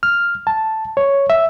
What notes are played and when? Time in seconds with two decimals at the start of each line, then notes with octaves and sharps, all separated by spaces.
0.03 F6
0.47 A5
0.97 C#5
1.30 E5